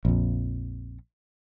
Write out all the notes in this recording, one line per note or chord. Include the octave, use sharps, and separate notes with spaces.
A#1 F2